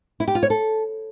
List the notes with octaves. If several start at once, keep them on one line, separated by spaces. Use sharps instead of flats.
E4
G4
F4
C#5
A4